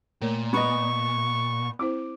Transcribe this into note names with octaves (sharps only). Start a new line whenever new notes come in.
A#2 A3 A#4 C#5
B3 D#5 C#6
C4 E4 C5 D6